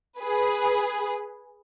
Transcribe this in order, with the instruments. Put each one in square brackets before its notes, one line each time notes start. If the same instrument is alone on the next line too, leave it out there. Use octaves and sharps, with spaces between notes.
[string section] G#4 B4